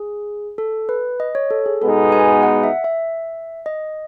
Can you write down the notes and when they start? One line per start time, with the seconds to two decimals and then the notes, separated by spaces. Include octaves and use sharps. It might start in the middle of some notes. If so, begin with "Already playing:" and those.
Already playing: G#4
0.58 A4
0.89 B4
1.20 D#5
1.35 C#5
1.51 A4
1.66 G#4
1.81 B2 G#3 B3 D#4 A4
2.12 G#5
2.43 F#5
2.64 E5
2.84 E5
3.66 D#5